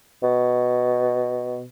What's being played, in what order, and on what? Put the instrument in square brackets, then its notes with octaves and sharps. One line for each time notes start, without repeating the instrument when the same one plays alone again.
[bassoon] B2